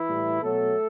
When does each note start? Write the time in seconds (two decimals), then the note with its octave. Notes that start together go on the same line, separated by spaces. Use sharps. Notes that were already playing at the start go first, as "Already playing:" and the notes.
Already playing: E3 E4
0.08 A2 G3
0.41 B2 F#3 A3 A4